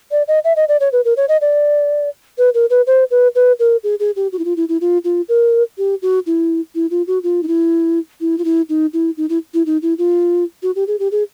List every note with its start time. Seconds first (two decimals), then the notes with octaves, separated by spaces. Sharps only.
0.11 D5
0.28 D#5
0.44 E5
0.56 D#5
0.68 D5
0.80 C#5
0.92 B4
1.05 A#4
1.17 C#5
1.29 D#5
1.41 D5
2.38 B4
2.54 A#4
2.70 B4
2.87 C5
3.11 B4
3.35 B4
3.59 A#4
3.84 G#4
4.00 G#4
4.16 G4
4.32 F#4
4.39 E4
4.45 F4
4.57 E4
4.69 E4
4.81 F4
5.04 F4
5.29 A#4
5.78 G4
6.02 F#4
6.26 E4
6.75 E4
6.91 F4
7.07 F#4
7.23 F4
7.43 D#4
7.48 E4
8.21 E4
8.38 F4
8.45 E4
8.69 D#4
8.93 E4
9.17 D#4
9.29 E4
9.54 E4
9.66 D#4
9.82 E4
9.98 F4
10.63 F#4
10.76 G4
10.87 G#4
11.00 G4
11.12 G#4